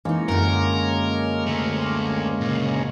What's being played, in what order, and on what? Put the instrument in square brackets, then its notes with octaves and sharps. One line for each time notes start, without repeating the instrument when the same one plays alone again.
[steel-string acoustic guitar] E3 D#4 [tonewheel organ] G#3 A#3 C#4
[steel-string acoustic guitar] F#2 D3 [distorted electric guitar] A#4
[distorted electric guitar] D2 A3
A#2 C#3